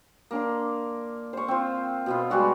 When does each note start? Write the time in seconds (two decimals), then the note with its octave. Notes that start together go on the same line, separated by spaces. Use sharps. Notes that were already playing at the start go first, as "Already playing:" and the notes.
0.31 A#3 D4 C6
1.33 C5 C#6
1.48 C4 F4
2.06 B2 B3 F4
2.30 G3 G#3 F#4 D5